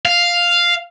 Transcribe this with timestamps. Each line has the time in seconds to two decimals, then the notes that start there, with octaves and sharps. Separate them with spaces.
0.06 F5